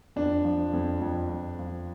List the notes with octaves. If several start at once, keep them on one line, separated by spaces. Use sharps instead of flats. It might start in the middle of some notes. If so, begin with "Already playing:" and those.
F2 D4
F3
F2
F2
F2
F3